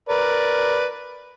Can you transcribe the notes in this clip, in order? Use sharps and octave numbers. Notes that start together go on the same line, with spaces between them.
A#4 B4 D5